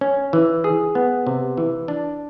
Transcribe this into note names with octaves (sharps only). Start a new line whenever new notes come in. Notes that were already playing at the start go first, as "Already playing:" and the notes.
C#4
E3
G#4
B3
C3
E3
D4